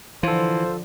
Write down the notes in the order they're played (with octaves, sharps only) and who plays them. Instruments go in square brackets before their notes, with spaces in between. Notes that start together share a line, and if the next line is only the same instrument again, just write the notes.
[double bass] D3 F3 [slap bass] E3 [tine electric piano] F4 A4 [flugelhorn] C5